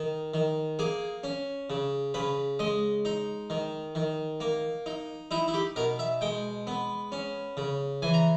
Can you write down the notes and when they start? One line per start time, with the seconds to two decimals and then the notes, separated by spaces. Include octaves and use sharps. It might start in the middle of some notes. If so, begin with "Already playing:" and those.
Already playing: D#3
0.34 D#3
0.79 A#3 G#4
1.24 C#4
1.70 C#3
2.14 C#3 B4
2.59 G#3 D#5
3.05 D#4
3.50 D#3
3.95 D#3
4.40 A#3
4.86 D#4
5.31 D#4 E4
5.48 E4
5.54 G4
5.76 B2 A#4
5.99 E5
6.21 G#3 G5
6.67 B3
7.12 C#4
7.57 C#3
8.02 E3 G#5
8.14 A#5